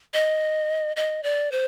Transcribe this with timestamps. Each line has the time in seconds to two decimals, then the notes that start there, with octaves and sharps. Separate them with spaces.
0.14 D#5
0.96 D#5
1.23 D5
1.52 C5